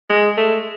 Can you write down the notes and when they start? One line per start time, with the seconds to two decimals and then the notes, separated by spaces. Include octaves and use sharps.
0.10 G#3
0.37 A3